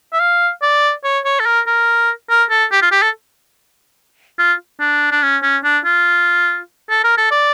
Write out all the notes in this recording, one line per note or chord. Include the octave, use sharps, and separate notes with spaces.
E5
F5
D5
C#5
C#5
A4
A#4
A#4
A#4
A4
G4
F4
G4
A4
F4
D4
D4
C#4
C#4
D4
F4
A4
A#4
A4
D5